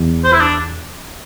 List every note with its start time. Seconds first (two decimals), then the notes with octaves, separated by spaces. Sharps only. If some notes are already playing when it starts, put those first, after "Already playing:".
Already playing: E2
0.24 C5
0.33 E4
0.40 D4